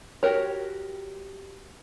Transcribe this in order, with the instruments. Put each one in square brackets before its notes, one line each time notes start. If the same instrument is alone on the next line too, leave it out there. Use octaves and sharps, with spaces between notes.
[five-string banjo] F#4 G4 A#4 C#5